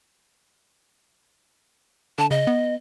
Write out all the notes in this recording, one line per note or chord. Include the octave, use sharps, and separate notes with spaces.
D3 A5
C#3 D#5
B3